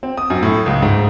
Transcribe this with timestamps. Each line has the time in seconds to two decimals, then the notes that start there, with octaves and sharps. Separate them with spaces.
0.03 C4
0.17 D#6
0.30 F#2
0.43 A2
0.66 C#2
0.82 G#2